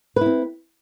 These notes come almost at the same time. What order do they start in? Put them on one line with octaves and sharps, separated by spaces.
B4 E4 C4